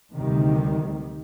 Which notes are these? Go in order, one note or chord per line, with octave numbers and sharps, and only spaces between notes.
D2 C3 D#3 G3